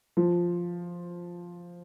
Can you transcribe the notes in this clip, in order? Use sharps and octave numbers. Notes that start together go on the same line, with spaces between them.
F3